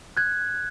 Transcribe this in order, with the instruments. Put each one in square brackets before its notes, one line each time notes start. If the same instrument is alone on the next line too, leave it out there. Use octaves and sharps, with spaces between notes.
[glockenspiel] F#6 G#6